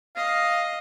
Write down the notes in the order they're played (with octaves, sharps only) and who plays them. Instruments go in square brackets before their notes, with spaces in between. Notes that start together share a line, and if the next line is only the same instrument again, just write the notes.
[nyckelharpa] D#5 [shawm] F5